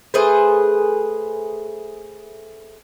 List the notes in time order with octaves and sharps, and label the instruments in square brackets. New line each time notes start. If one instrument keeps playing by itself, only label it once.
[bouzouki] A3 G#4 B4 C5